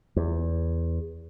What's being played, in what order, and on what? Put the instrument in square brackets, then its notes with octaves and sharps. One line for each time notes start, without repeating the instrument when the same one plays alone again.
[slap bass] E2